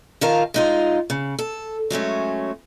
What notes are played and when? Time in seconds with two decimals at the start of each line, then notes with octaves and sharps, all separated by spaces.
0.21 D#3 F3 F4 A#4 F5 A5
0.54 G#3 D#4 F4
1.10 C#3
1.39 A4
1.90 F#3 G#3 A3 C#4